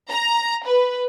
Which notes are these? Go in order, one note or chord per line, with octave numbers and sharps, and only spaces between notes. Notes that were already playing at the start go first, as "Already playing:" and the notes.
A#5
B4